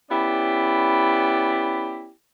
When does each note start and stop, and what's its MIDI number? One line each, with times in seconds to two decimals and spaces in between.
0.11 2.10 59
0.11 2.10 61
0.11 2.10 64
0.11 2.10 67
0.11 2.10 74